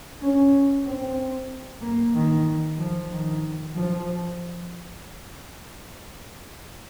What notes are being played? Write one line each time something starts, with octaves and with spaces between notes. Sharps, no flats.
C#4
C4
A#3
D#3
F3
D#3
F3